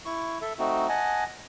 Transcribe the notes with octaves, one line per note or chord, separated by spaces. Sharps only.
E4 C#6
A4 E5
A3 C4 D#4 F#4
D#5 F#5 G#5 A5